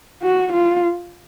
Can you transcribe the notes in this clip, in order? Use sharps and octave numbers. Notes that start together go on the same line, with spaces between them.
F#4
F4